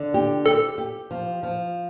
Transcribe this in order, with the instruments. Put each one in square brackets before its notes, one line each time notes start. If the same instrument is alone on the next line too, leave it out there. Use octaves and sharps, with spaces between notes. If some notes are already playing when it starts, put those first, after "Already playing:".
Already playing: [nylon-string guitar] D3
G4
[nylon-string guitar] G4 [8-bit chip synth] A4
[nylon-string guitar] G4
F3
F3